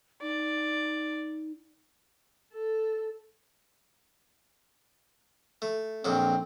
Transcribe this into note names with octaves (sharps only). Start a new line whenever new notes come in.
D#4 D5
A4
A3
A#1 F2 F#3 C4